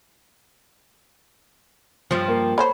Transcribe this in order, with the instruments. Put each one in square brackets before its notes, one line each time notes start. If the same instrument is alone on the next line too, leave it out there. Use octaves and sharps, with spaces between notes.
[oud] G2 F3
[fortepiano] A#3
[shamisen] A#3 A4 C5 [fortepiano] C#5 [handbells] B5